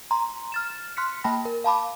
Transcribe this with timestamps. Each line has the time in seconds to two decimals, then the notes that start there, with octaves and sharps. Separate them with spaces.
0.11 A#5 C6
0.52 F6 A6 E7
0.97 C6 F6 F#6 B6 C#7
1.24 A#3 G5 A5 B5 A#6
1.45 A#4
1.64 F5 A5 B5 D6